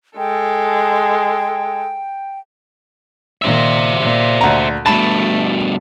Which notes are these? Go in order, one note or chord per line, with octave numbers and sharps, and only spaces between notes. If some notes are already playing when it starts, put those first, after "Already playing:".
G#3 A4 G5
A#2 D#3 C5 E5
A#2
D2 A#5
G2 B2 A3 A5 B5